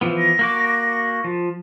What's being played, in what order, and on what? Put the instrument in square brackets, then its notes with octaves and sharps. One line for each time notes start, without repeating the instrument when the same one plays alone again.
[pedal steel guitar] E3 F3 B3
[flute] A#6
[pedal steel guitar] A#3 F#4 D6
F3